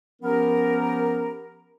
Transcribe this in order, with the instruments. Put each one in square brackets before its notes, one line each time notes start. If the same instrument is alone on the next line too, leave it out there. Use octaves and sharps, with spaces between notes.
[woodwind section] F3 B3 C#4 G4 A#4